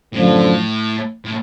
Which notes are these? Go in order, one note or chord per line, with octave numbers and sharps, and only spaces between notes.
F#2 A2 D3 F3
A2